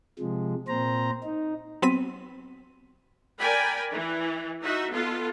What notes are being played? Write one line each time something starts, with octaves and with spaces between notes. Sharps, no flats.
C3 F3 G#3
A#2 C4 C5 A#5
D#4
F#3 B3 C4 B6 D#7
A#4 D5 G5 G#5 B5
E3
D#4 F#4 E5
B3 F4 A4